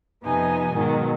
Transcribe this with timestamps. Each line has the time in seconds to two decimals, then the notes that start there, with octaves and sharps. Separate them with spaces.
0.23 F2 C3 B3 D#4 G#5
0.75 G#2 B2 D#3 F#3